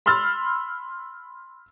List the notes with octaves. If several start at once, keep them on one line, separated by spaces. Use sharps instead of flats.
B5 C6 E6 F6 A6